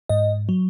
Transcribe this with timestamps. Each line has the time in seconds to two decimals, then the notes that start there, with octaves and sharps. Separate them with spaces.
0.09 G#2 D#5
0.49 F#3